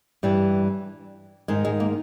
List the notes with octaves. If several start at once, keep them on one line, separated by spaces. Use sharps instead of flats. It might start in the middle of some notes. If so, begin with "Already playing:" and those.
G2 E3 G3
G#2 D#3 G#3
G#3
A#3